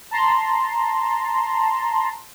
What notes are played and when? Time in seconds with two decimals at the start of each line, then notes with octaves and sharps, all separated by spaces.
0.11 A5 A#5 C6